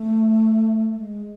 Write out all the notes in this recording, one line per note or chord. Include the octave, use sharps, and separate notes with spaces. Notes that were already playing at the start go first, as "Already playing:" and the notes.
Already playing: A3
G#3